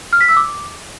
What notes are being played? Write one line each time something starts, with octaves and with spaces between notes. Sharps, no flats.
F6
B6
E6
D6